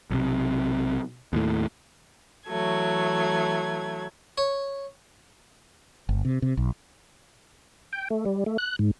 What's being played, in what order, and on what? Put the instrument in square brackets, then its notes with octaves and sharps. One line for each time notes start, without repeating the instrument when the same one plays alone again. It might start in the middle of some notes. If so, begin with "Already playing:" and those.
[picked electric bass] B1 C3
D#2 A2
[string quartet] E3 F#3 A3 G#6
[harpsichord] C#5
[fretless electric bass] G1
C3
C3
B1
[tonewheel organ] G5
A3
G3
A3
F#6
G#2